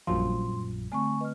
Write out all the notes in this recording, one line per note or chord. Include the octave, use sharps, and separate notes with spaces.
A#1 F#2 F3 G3 C6
D3 A3 C4 G#5 C#6
B4 D#5 F6